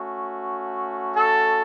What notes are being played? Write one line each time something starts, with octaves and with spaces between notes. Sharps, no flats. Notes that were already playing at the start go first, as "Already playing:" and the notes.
Already playing: A3 C#4 F#4
A4